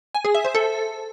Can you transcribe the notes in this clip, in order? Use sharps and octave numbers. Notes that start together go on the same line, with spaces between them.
G#5
G#4
E5
C5
A4